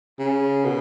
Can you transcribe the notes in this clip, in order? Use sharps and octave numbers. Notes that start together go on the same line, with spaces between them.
C#3
B2